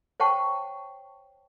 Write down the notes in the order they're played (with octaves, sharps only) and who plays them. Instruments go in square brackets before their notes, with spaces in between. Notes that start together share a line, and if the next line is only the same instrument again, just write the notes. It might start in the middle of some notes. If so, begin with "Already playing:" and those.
[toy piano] C5 C#5 F#5 G5 A5 C#6